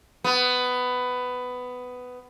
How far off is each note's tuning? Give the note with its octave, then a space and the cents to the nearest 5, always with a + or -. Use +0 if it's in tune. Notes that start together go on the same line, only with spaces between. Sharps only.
B3 +15